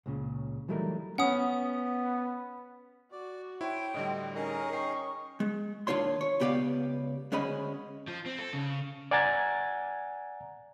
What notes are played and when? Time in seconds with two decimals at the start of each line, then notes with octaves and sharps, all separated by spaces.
0.06 C#2 A#2 C#3
0.68 E3 F#3 G3 A3 D#4 A#4
1.18 B3 C#4 F#5 D#6
3.12 F#4 D5
3.61 E4 C5 C#5 G5
3.94 A2 D3 G3 D#5
4.35 C#4 D#4 G#4 A#4 D#5
4.73 G5 C#6 C7
5.40 G#3
5.87 D#2 D4 F4 C#5 C6
6.21 C#5
6.40 C#2 B3 G4 D5 F5
7.32 D2 G#3 C#4 D#5 B5
8.08 F3
8.26 C4
8.39 A4
8.53 C#3
9.11 D5 F#5 G#5 A#5 G#6 A6